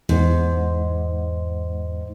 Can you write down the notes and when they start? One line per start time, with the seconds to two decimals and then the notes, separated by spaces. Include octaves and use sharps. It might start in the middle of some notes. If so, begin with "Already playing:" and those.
0.09 E2 G#2